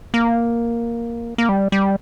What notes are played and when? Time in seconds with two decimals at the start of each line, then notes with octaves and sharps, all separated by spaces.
0.14 A#3
1.38 A#3
1.49 G3
1.72 G3